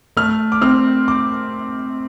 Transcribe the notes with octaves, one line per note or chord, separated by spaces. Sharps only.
A3 F6
D6
C4 F6
D6